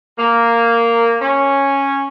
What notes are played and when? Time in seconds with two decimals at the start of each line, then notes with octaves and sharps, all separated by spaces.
0.19 A#3
1.22 C#4